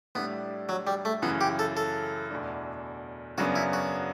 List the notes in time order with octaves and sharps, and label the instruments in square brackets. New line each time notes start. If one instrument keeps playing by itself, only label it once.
[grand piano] A2 G3 D4 [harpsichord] B3
[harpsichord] F#3
G3
A3
[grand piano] F#2 C#3 E3 [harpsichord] B3
[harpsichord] G4
A4
A4
[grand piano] E2 B2 A3 D4
[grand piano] F#2 C#3 F#3 B3 D4 [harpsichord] F#4
[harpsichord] E4
F#4